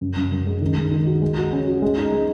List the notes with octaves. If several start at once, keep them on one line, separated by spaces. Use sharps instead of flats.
F#2
F#2
F#2
G#3
D#3
G#3
D#3
F#4
G#3
F#4
C#4
F#4
G#3
D#4
G#3